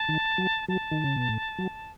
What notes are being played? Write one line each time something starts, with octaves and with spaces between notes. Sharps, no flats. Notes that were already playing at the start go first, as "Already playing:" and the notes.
Already playing: A5
D#3
F#3
F#3 A5
D#3
C#3
B2
A2
F#3